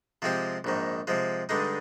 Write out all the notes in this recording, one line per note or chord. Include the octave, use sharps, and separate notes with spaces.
C3 F3 G#3 C4 G4
A#1 G#2 D#3
C3 F3 G#3
G2 D3 G#3 D#4